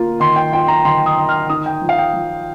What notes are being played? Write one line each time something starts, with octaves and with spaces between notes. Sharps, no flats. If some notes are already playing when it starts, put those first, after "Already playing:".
Already playing: A#3 F4
D#3 C6
G5
F4 G5
A#5
D#3 C6
D#6
D#3
F6
D#4 D#6
G5
F3
F5
G5
F3